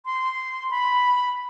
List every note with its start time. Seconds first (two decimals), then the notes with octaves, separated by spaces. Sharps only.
0.05 C6
0.70 B5